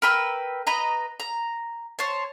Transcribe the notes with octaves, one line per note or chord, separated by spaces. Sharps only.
A#4 B4 G5 E6
B4 D#5 A#5
A#5
C5 C#5 A5